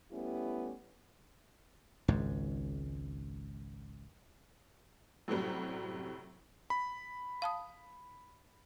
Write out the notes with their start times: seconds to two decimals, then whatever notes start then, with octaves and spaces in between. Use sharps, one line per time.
0.11 G3 A3 B3 C#4 E4 G4
2.08 G#1 C#2 G#2
5.28 F#2 A2 C3 F#3 G3
6.70 B5
7.42 F5 A5 D#6